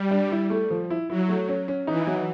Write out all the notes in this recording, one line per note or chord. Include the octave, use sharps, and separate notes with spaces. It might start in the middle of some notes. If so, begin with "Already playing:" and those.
Already playing: G3
D4
E4
A3
F3
E4
F#3 E4
A3
C#4
C#4
E3 D#4
F#3